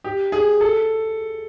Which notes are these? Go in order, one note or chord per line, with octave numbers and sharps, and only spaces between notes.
G4
G#4
A4